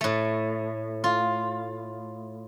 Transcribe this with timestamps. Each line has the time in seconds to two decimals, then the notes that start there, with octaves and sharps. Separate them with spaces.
0.01 A2 A3
1.04 F4